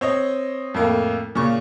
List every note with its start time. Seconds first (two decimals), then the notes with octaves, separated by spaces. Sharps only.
0.01 C4 C#5 D#5
0.74 F2 A2 A#3
1.35 A#2 C#3 C#6